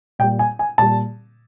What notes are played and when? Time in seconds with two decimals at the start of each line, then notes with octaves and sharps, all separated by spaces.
0.19 A#2 G5
0.23 G3
0.39 G#5
0.59 G#5
0.78 A#2 G3 A5